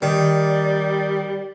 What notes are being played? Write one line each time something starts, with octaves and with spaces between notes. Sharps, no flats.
D#3 G3 D5